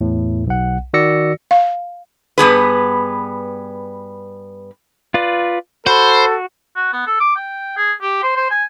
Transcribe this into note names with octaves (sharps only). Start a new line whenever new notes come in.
E2 A2
B1 F#5
D#3 F#4 D5 E6 A#6 C#7
F5
G2 B3 G#4 B4
F4 B4 D5
F#4 A4 C5 B5
F#4
B3
A4
D6
G5
G#4
G4
C5
C5
G#5